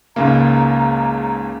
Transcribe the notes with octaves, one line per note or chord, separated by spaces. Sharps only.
C#2 G#2 C#3 A#3 A#5